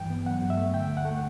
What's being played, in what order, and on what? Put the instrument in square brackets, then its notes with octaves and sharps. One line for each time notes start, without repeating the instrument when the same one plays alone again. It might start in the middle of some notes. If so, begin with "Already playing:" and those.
Already playing: [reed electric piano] G2 E3 G5
B3
F#3 F#5
G2
E5
A3
D3 G5
D2
F#5
A3